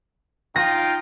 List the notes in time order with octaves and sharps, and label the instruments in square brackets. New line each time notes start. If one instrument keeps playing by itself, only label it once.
[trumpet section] D#4 F4 G5 [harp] A#6